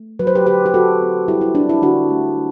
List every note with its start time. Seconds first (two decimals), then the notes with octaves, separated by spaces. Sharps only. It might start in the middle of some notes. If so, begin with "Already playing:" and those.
Already playing: A3
0.19 F#3 B4
0.27 C5
0.35 G4 B4
0.46 D3 G4 B4
0.66 G4
0.74 C4 F#4 A4
1.02 C4
1.28 G3 E4 G4
1.41 E4
1.55 C4 D4
1.69 E4
1.82 D3 D4 F#4
2.10 A3